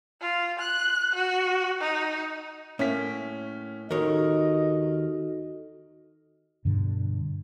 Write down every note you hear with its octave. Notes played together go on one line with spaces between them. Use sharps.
F4
F#6
F#4
D#4
A2 A#3 C#4 B6
D#2 D#3 D#4 F#4 A4 A#4 C#5 D#5
G2 B2 D3 G3